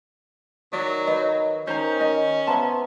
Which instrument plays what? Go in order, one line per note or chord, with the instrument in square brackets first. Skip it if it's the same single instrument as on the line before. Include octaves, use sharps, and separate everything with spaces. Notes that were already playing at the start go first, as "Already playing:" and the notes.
[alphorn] D#3 [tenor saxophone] F#3 [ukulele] D5
[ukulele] B4 [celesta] C#5 D#5
[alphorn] D#3 [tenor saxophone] C#4 [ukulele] C5 A#5 [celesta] G6
[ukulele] D#5
[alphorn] B3 [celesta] C5 A#5 C6 [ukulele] E5 A5